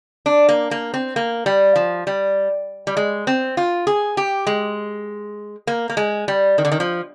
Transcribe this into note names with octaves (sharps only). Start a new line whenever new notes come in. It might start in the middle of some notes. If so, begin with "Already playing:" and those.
D4
A#3
A#3
C4
A#3
G3
F3
G3
G3
G#3
C4
F4
G#4
G4
G#3
A#3
A#3
G#3
G3
D#3
D3
D#3
F3